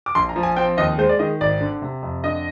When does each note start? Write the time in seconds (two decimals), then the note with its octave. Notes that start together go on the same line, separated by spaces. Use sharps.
0.06 D6
0.15 A#1 C6
0.29 A#5
0.36 F3
0.43 G#5
0.57 C4 G5
0.77 D#2 D#5
0.98 G#3 C5
1.09 D5
1.19 D#3 D#5
1.41 G#1 D5
1.61 D3
1.82 C3
2.02 F2
2.24 D3 D#5